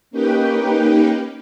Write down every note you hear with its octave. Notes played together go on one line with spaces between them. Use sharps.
A#3 C#4 D#4 G4 B4 G5